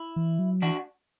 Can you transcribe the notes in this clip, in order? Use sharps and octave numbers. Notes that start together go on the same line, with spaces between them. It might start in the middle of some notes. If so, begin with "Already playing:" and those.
Already playing: E4
E3
F#3
E3 D4 F#4